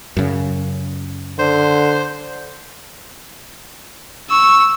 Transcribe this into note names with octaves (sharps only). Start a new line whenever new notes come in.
F#2 C#3
D3 C5
C#6 E6